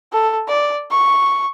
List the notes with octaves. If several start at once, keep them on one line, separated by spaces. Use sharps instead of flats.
A4
D5
C#6